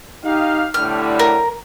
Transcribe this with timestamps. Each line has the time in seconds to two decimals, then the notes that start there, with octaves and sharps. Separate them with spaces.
0.23 D#4 G4 F5
0.74 A2 D3 G3 F6
1.19 A#4